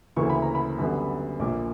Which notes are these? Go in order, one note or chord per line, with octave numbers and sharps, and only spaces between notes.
D2 C#3 E3 A#3 C#6
B5
A#5
B5
F#2 D3 G3 B3
A#1 A#2 A#3 D6